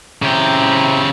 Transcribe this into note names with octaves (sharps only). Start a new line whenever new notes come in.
C#3 C4 E4 G4 A#5